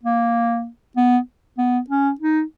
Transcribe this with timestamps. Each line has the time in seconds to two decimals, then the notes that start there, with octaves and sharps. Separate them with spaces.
0.03 A#3
0.97 B3
1.58 B3
1.90 C#4
2.20 D#4